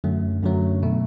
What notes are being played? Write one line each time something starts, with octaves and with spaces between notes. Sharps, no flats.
F#2 D3 F#3 A3
F#2 D3 F#3 A3
B2 A3